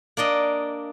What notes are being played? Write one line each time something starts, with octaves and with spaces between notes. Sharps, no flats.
A#3 D4 D5 D#5